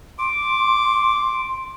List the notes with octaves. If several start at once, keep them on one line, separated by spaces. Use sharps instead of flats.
C6 D6